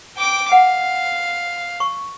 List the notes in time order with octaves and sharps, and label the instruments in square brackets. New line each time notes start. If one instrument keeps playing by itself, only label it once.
[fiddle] G5 D6
[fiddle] F5 [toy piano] F#5
[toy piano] C#6